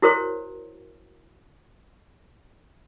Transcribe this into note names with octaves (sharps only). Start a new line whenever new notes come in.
E4 F#4 A#4 C5 C#5